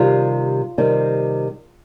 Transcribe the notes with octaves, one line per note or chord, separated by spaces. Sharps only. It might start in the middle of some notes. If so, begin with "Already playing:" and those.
Already playing: C3 D#3 G3 C4 F4
C3 D#3 G3 C4